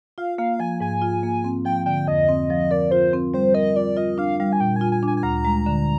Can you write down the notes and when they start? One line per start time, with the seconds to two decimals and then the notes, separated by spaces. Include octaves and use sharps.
0.18 F4 F5
0.38 A#3 F5
0.60 F3 G#5
0.80 G#2 G#5
1.02 F4
1.23 A#3
1.44 C4
1.65 F3 G5
1.86 D3 G5
2.07 F2 D#5
2.29 C4
2.50 F3
2.71 A#4 D5
2.91 F4 C5
3.13 C4
3.34 G3 C5
3.54 A#4 D#5
3.76 F4 D5
3.97 F4 D#5
4.18 D4 F5
4.40 G3 F5
4.53 G#5
4.60 A#2 G5
4.76 F4 G#5
4.92 G#5
5.03 D4 G#5
5.17 G#5
5.23 D2 A#5
5.45 G#3
5.66 D3